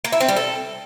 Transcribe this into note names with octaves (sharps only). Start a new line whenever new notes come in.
A#3
E4
C4
G3
A4